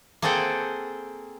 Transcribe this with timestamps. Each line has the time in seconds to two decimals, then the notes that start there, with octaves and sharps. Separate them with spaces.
0.22 A#3 C4 G#4 A4 F#5 G5